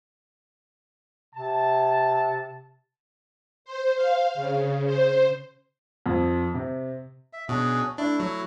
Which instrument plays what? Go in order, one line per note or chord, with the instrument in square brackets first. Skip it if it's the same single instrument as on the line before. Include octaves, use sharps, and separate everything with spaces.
[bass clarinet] C3 [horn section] A5
[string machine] C5
F5
C#3
C5
[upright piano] F2
C3
[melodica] E5
[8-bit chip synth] B2 [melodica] C#4 D4 G#4
[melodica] A3 E4 [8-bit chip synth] D4
[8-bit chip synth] F#3